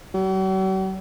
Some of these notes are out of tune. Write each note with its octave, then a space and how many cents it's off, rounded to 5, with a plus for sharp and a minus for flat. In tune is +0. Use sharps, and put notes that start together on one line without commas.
F#3 +45